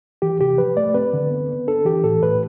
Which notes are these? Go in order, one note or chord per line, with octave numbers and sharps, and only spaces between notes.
E3 G4
C3 G4
F3 B4
A3 D5
C4 B4
D3
B3
B3
D4 A4
E3 G4
A2 A4
A2 B4